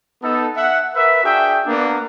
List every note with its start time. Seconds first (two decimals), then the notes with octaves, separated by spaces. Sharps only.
0.22 B3 D#4 A4
0.56 E5 F#5
0.95 A#4 B4 E5
1.24 D4 F#4 G#4 E5 G5
1.67 A#3 B3 D4